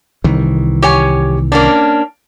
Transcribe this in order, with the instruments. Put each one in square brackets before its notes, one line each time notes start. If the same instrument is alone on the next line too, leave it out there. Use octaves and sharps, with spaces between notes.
[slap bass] C2 D#3 E3
[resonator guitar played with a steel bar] G4 C#5 G#5
A#3 C#4 D4